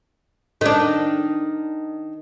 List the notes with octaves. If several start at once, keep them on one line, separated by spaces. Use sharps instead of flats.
D#3 D4